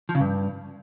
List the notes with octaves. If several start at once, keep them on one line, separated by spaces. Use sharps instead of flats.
F3
C#3
G2